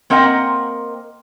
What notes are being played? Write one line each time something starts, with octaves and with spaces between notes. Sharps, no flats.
A#3 C4 A#4 D#5 F#5 G5